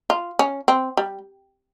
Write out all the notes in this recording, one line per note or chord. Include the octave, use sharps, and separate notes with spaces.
F4
C#4
C4
G3